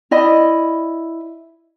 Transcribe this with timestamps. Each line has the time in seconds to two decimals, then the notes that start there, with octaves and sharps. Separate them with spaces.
0.11 E4 D5 D#5 B5